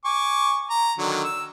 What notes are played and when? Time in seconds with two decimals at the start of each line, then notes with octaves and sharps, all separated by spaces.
0.05 G#5 C#6 D6
0.70 A#5
0.98 D3 D#3 F#3
1.24 E6